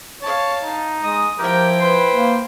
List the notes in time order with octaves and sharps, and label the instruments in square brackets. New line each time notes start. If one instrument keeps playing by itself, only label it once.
[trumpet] C#5 [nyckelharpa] F5 A5
[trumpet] D#4
[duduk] G#3 [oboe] D#5 [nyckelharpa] D#6
[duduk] F3 [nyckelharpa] E4 G5 [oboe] G4 [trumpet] A#4
[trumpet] B4 [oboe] C5
[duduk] A#3